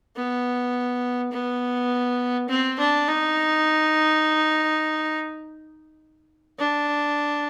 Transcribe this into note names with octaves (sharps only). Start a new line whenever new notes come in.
B3
B3
C4
D4
D#4
D4